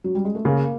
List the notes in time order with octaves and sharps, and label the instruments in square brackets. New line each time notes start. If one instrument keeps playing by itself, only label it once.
[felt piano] F#3
G3
G#3
A3
[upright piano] C#3 [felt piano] A#3